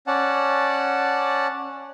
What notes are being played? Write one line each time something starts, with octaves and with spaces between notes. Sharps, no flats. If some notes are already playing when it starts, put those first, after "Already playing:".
C#4 D5 F#5 A5